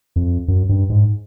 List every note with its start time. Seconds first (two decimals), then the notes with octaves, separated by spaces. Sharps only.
0.16 F2
0.48 F#2
0.69 G2
0.90 G#2